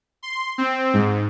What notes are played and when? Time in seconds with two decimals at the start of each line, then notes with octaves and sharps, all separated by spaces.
0.23 C6
0.58 C4
0.94 G#2